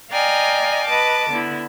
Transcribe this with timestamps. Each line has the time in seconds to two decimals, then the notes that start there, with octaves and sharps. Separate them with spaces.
0.10 D5 D#5 F5 G5 G#5 A#5
0.85 B4 D#5 A5 D6
1.29 D3 B3 E4